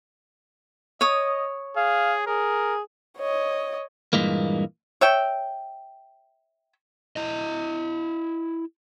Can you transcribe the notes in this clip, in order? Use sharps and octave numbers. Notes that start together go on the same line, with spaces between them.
C#5 D#5 D#6
G#4 F5
G#4 A#4
C#5 D#5
G2 A#2 E3 G#3 A#3
C#5 E5 G5
E4 D#5